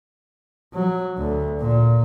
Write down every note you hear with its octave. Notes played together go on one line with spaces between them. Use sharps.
F#3
D2
A#2